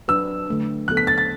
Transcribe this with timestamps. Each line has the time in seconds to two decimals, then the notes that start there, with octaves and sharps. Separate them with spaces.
0.08 F#3 D4 F#4 B4 E6
0.48 D3 A3 D4
0.88 D3 F#3 B3 F#4 A4 F#6
0.97 B6
1.07 A6
1.18 A6